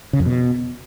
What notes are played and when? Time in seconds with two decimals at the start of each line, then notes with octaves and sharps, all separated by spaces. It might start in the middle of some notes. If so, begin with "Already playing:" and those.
0.13 C#3
0.20 F2
0.26 B2